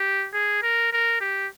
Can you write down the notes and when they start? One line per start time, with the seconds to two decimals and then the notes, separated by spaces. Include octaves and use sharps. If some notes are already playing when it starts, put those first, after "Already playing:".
Already playing: G4
0.34 G#4
0.62 A#4
0.93 A#4
1.21 G4